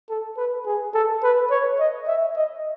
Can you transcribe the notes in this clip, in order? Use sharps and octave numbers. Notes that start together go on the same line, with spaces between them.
A4
B4
G#4
A4
B4
C#5
D#5
E5
D#5